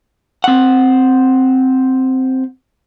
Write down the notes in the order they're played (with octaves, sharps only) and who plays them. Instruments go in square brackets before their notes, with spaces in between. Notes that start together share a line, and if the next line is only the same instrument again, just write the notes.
[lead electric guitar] C4 F#5